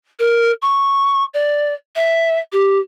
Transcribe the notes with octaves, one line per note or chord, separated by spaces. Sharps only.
A#4
C#6
D5
E5
G4